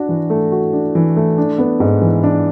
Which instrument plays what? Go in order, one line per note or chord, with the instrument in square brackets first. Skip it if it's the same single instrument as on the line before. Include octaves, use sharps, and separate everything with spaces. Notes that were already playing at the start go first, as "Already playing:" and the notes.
Already playing: [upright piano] D4 F#4
E3
A3
F#4
D4
E3
A3
D4
B3
G#2
E3
D4